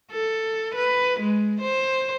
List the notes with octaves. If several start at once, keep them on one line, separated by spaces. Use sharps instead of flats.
A4
B4
G#3
C5